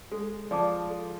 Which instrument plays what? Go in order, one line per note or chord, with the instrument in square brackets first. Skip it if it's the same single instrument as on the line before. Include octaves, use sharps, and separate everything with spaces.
[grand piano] G#3 [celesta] A4
[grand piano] F3 [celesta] D5 A5 D6
[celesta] A4